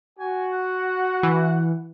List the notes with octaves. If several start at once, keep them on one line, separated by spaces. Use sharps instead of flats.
F#4 G#5
F#5
E3